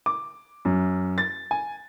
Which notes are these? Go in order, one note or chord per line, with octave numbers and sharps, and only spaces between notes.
D6
F#2
A6
G#5